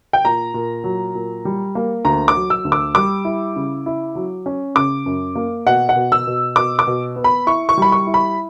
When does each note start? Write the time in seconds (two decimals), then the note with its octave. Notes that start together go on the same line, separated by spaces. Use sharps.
0.13 G5
0.25 A#2 A#5
0.54 A#2
0.84 F#3
1.15 A#2
1.45 G3
1.75 A#3
2.05 D2 A#5
2.28 D6
2.35 F#3
2.50 E6
2.65 D2
2.72 D6
2.95 G3 D6
3.25 E4
3.56 C#3
3.86 E4
4.15 F#3
4.46 C#4
4.75 C#3 D6
5.06 F#2
5.35 A#3
5.67 B2 F#5
5.89 F#5
5.96 B2
6.12 E6
6.27 B2
6.56 B2 D6
6.79 D6
6.87 B2
7.16 B3
7.24 B5
7.47 E4 C#6
7.69 C#6
7.77 G3 B5
7.92 C#6
8.07 E4
8.14 B5